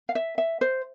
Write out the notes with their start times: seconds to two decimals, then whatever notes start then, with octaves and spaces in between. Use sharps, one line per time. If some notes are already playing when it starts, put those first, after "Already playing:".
0.09 F5
0.15 E5
0.38 E5
0.61 C5